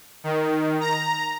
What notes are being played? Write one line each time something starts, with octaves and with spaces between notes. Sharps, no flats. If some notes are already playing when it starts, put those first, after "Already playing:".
D#3
A#5